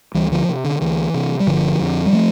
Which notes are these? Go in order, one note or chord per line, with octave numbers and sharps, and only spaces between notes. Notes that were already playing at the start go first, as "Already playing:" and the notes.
D2 E3 G3
D3 F3
C3
D3
D2 E3
C3
G3
G1 D3 F3
F2 D3
G3
F3 A3